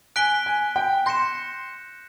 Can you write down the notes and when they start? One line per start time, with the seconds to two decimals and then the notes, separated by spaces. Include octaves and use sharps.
0.16 G#5 F#6 B6 D7 G7
0.46 G#5
0.76 G5
1.06 C6 G6 A#6 C#7 E7